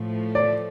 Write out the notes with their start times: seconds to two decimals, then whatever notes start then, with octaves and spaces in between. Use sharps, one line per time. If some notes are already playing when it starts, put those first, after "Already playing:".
Already playing: A2 F3 A3
0.35 D5